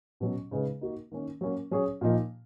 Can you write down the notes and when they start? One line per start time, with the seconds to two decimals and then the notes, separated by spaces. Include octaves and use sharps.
0.20 B2 F#3 C#4
0.51 C#3 G#3 D#4 G#4 B4
0.81 A#3 D#4 F#4
1.12 D#3 A#3 C#4
1.41 F#3 A#3 C#4
1.71 F#3 C#4 G#4 C#5
2.01 A#2 F3 A#3 D#4